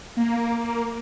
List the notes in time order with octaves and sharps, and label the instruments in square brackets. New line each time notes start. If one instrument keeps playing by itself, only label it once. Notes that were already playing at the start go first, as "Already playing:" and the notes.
[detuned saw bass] A#3